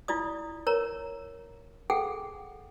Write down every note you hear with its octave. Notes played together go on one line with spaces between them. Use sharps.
E4 F4 D5 D#6
A#4 C#5 A#5
G#4 A4 F#5 G5